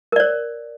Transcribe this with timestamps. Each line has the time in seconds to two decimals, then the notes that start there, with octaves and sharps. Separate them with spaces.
0.12 A#4
0.16 D5
0.20 C#5